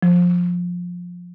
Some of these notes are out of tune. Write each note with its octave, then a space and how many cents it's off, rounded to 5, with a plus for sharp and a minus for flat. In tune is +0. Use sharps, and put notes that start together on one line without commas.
F3 +20